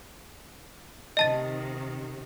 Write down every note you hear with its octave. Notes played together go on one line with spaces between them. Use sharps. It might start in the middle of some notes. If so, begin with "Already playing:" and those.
C3 D#3 D#5 A5 A6